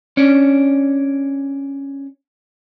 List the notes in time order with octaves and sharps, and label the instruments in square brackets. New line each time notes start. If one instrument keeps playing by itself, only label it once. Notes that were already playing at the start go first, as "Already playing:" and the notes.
[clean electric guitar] C#4 D4